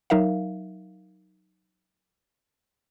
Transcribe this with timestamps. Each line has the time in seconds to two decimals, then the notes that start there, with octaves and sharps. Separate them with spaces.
0.10 F#3 D#4 A#4 E5 F5